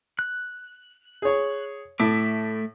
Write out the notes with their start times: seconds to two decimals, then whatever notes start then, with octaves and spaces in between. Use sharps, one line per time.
0.19 F#6
1.22 G#4 C#5
2.00 A2 A3 E5 D6